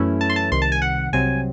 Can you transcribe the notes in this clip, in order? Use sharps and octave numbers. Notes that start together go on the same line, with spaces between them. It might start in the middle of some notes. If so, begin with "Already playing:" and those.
Already playing: F#2 E3 A3 C#4 E4
A5
C6
A5
C2 C3 D#3 C6
A5
G#5
F#5
C2 C3 F#3 C4 G#5